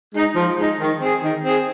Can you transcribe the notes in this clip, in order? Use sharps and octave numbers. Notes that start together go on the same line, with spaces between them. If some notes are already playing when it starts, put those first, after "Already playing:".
G#3 D#4
F3
G#3 D#4
D#3
C4 G#4
D#3
C4 G#4